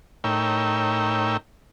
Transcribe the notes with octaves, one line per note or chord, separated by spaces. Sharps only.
A2 D#4 A#4 C#5 G5 E6